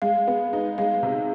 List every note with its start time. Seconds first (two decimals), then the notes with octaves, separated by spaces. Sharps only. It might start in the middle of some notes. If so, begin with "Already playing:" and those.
0.02 G#3 F5
0.27 B3
0.53 D#4
0.78 G#3 F5
1.03 C3